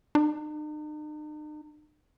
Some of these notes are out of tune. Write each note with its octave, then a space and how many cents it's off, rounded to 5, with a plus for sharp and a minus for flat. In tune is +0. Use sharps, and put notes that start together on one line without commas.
D#4 -45